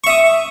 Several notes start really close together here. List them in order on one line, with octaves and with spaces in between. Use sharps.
C#6 E5 D#6